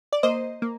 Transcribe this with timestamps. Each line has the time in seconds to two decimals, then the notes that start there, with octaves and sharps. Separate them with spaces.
0.13 D5
0.23 A#3 C5 D#5
0.62 A#3